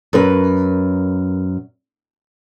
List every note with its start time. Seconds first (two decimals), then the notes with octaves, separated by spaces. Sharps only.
0.13 F#2 A#4 B4